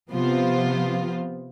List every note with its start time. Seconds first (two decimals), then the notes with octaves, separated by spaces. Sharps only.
0.10 C3 F3 B3 F4 C5